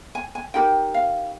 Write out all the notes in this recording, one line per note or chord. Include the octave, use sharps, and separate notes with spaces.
G#5
G#5
D#4 G4 A#4 G5
F5